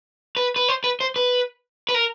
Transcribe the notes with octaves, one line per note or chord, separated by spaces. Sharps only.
B4
B4
C5
B4
C5
B4
B4
A#4